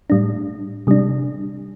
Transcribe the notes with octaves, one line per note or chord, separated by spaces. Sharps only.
A2 G3 D4
C3 G3 D4